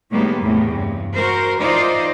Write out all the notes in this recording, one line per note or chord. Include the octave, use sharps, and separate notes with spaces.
A2 D#3 G3 G#3 A#3 B3
E2 A2 C3
G2
F#4 A#4 C5
E3 D#4 F4 C5 D5 D#5